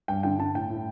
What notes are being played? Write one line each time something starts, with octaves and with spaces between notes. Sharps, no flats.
G2 G5
D3 G5
D3 A5
A2 G5
A2